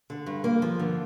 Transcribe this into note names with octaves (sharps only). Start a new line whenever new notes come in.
D3
G2
A#3
F3
D3